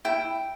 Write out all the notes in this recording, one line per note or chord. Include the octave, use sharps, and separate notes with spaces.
E4 G5